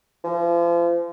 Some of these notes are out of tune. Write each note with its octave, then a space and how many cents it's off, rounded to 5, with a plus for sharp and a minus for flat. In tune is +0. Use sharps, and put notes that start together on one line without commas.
F3 -35